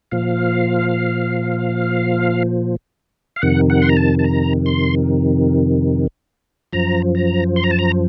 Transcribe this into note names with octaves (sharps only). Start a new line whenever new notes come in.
A#2 F3 F5
F5
F2 C3 D#3 F#5
F#5
C6
A#5
A5
A5
A#5
C6
F#2 F3 A#5
A#5
C6
A#5
A5
A#5